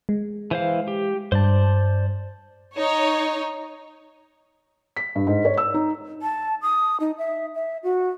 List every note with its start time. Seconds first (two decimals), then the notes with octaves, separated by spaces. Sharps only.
0.09 G#3
0.51 E3 C5 F5
0.88 G4
1.32 G2 C5 D5 A5
2.76 D#4 C#5
4.96 B6
5.15 G2
5.27 G#2
5.45 C#5
5.57 E6
5.74 D#4
6.22 A5
6.62 D#6
7.00 D#4
7.18 E5
7.55 E5
7.83 F#4